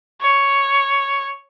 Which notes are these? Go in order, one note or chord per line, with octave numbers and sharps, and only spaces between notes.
C#5